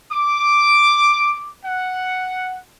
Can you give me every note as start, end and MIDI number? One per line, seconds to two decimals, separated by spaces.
0.11 1.55 86
1.64 2.58 78